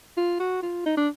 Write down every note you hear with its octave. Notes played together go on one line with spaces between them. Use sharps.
F4
F#4
F4
D#4
D4